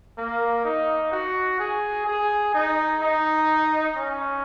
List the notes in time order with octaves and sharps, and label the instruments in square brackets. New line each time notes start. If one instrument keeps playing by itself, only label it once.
[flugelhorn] A#3
D#4
F#4
G#4
G#4
D#4
D#4
C#4